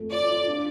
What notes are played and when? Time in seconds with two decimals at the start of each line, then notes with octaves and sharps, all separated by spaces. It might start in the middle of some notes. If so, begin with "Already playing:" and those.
Already playing: F2 A3
0.11 F4 D5
0.30 F4
0.47 D4